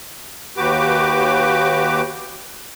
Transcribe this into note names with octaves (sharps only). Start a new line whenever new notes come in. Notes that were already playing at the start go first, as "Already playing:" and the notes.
D#2 F#4 G4 B4 D6